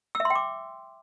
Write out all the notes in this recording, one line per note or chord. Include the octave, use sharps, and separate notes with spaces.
E6
E5
C6
G5
D6